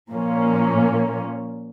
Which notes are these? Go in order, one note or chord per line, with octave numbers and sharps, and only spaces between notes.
A#2 F3 A#3 C#4